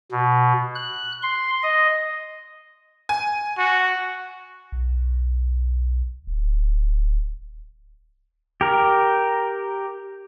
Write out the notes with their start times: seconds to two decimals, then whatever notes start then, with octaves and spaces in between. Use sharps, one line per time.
0.11 B2
0.75 F#6
1.22 C6
1.63 D#5
3.09 G#5
3.58 F#4
4.72 B1
6.27 D1
8.61 G4 A#4